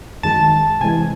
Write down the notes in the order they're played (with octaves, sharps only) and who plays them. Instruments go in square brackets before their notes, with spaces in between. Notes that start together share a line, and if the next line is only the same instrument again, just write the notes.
[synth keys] F#2 D#3 G#3 A5
C3 E3 G#3 G#5